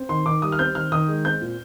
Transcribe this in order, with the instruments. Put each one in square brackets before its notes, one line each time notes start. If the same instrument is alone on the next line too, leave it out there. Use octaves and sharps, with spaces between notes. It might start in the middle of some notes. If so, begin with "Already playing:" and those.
Already playing: [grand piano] C4
D#3 C6
D#3 D6
G3 D#6
F6
C4 G6
D#3 F6
D#3 D#6
G#3
C4 G6
A#2